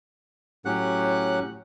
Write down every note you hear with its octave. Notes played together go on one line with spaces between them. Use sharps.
A2 F#3 C#4 G4 F#5 F#6